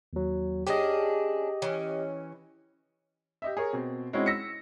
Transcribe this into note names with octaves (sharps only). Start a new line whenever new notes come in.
D#2 F#3
C#4 D4 G4 G#4 D#5
E3 C#4
G4 D#5 E5
G#4 A#4 C#5
B2 C4
G#3 C4 C#4 D#4 E4 F#4
E6 A#6 B6 C#7